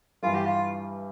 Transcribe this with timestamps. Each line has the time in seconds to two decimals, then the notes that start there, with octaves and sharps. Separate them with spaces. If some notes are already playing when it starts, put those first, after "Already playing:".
0.23 G2 E3 G3 F4
0.35 G4
0.46 F4